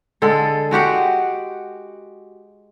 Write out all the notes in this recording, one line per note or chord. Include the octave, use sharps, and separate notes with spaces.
D3 G#3 A4
G#3 F#4 G4 F#5